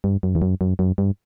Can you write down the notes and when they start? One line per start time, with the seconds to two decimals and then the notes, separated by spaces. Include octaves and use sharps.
0.04 G2
0.23 F#2
0.35 E2
0.42 F#2
0.61 F#2
0.79 F#2
0.98 G2